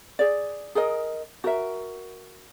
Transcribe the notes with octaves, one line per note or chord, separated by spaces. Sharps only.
G#4 D5
G#4 A#4 D#5
F#4 A#4 E5